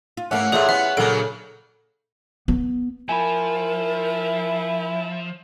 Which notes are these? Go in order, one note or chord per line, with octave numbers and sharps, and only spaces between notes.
F4
G#2 A3 A#3 C#4 E4 F#5
A#2 A3 E4 F4 G4 G#4 C#5
B3 C#4 E5
A#2 C#3 F#3 A#3 D4 A4 D7
B3
F3 E4 A#4 G#5 B5